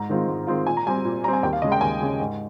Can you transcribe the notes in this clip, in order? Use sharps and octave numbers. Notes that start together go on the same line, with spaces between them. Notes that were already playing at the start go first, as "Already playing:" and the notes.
Already playing: G#2 A#5
D#3 G#3 C4 F4
G#2
D#3 G#3 C4 F4
A#2 G#5
A#5
G3 C4 G#5
A#2
G3 C4 A#5
G#5
D#2 G5
F5
C#3 G#3 D#5
G5
D#2 G#5
C#3 G#3
G#2